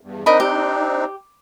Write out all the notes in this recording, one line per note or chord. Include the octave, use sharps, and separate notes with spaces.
E2 G2
C4 D4 D#4 A#4 D#5 B5
G4